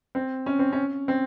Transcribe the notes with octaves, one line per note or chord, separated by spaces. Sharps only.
C4
C#4
C4
C#4
C4